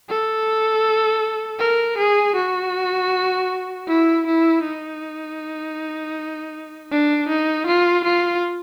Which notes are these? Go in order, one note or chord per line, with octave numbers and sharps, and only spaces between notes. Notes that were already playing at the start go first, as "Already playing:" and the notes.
A4
A#4
G#4
F#4
E4
E4
D#4
D4
D#4
F4
F4